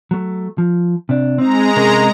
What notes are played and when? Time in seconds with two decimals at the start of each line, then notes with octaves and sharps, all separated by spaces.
0.11 F#3 A3
0.58 F3
1.09 C3 D4
1.38 G#3 C4 D#4 A#5
1.76 C3 C#4 A#4